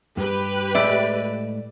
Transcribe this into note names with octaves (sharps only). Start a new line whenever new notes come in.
G2 G4 B4
A2 G#3 D5 E5 B5